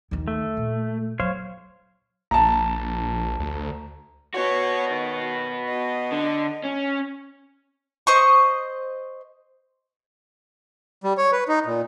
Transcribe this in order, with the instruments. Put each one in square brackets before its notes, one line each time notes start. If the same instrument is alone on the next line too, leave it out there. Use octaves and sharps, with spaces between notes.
[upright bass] D#2 D#3
[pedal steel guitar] A3
[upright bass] A#2
[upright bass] F#3 [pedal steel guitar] C5 C#5 F5
[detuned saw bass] A#1 [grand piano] A5 A#5
[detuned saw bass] D2
[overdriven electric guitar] B3 F#4 [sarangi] C#5
[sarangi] D#3
D#5
[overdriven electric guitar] D3
C#4
[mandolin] C5 D#5 C#6
[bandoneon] G3
C#5
B4
D#4
A#2